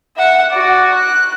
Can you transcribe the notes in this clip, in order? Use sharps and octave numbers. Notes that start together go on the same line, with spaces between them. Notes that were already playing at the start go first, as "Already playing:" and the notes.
E5 F#5
F#4 D5
F#6